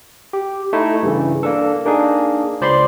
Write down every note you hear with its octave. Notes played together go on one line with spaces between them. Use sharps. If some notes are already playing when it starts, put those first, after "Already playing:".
G4
A3 D#4 E4
G2 C#3 E3
A#3 D4 A4
A#3 D4 D#4 G#4
C#2 C5 D5 B5 C6